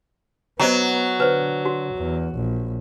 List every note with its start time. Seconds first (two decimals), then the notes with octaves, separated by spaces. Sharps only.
0.60 F#3 B3 C5 D#5 A#5
1.20 D3 B4 C5
1.65 F#4
1.95 E2
2.36 A#1